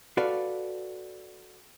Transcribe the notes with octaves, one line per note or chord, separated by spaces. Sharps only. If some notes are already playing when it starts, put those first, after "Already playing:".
F#4 A4 B4 D5 F5